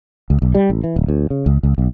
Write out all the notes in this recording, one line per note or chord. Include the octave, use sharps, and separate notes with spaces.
C#2
B1
G3
A1
E3
D1
D2
C#3
C#2
C#2
B1